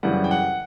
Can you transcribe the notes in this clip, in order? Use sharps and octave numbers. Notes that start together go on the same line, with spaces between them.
F#2 C#3 E3 G3 F#5
G5
F#5